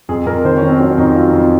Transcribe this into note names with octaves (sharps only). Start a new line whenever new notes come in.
F2 G#4
F2 A#4
D#3 C5
C#4
D#3
C4
F#3 C#4
C#4
F2 D#4
F#3 F4
F2